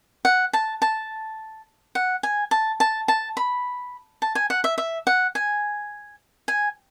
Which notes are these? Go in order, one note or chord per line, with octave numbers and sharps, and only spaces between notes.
F#5
A5
A5
F#5
G#5
A5
A5
A5
B5
A5
G#5
F#5
E5
E5
F#5
G#5
G#5